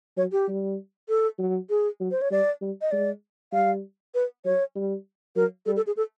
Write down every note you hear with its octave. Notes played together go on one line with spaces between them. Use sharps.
F#3 C#5
G4
G3
A4
F#3
G#4
F#3
C5
C#5
G3 D5
G3
D#5
G#3 D5
G3 F5
B4
F#3 C#5
G3
F#3 A#4
G3 A4
A4
G#4
A4